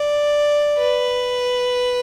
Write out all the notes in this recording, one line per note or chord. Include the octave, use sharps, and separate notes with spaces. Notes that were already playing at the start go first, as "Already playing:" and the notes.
Already playing: D5
B4